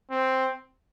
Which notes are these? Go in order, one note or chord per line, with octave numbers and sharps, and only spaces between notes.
C4